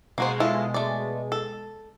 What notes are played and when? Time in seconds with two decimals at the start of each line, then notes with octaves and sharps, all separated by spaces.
0.18 B2 G#3 A#3 F#4 C5
0.40 E4 F4 A4
0.74 A3 D5
1.32 A4